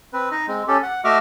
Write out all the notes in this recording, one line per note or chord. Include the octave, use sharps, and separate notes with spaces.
C4 B4
D#4 D#5
G#3 C4
C#4 G4 A4
F#5
A3 F#4 D#5 E5 D6 F6